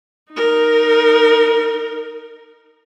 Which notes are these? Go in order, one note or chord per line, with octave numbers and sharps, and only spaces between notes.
D#4 A#4